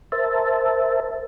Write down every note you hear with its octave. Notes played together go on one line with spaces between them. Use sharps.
A#4 C5 E5 A5